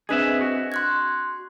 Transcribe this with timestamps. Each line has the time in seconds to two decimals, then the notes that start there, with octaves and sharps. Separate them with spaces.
0.09 C4 D4 G#4 B4 D#5 E5
0.41 F#4
0.72 C6 F#6 G#6